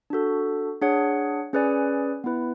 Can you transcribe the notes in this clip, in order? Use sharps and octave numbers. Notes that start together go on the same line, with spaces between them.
D4 F#4 A4
D4 G#4 C#5 F#5
C#4 G#4 B4 D5 G#5
B3 E4 B4